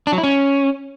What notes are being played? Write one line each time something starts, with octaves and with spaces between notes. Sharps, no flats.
D4
F#3
E4
C#4